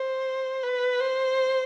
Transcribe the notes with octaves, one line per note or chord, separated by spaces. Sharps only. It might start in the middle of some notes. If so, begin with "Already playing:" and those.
Already playing: C5
B4
C5